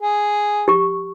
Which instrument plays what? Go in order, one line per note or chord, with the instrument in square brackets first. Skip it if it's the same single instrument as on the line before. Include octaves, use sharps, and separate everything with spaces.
[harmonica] G#4
[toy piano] G4 C#6